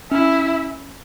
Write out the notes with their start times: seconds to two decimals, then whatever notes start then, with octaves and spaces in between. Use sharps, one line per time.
0.11 C#4 E4